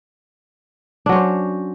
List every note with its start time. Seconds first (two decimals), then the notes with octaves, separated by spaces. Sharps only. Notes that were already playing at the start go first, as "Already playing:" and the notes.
1.06 D4
1.09 F#3
1.12 C#4
1.15 C5